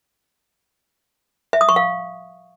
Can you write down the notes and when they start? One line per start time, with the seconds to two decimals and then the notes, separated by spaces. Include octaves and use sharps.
1.53 E5
1.61 D#6
1.69 C#6
1.76 F5